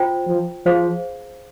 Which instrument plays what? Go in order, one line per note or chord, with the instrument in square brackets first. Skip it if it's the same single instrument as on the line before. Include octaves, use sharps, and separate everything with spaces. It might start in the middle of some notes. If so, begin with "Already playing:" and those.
Already playing: [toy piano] F4 C5 G5 A#5
[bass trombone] F3
[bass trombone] F3 [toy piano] G#4 C5 F5